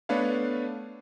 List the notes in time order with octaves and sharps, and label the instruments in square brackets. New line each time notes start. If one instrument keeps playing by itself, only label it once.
[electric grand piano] A3 B3 D4 B4 C#5 F5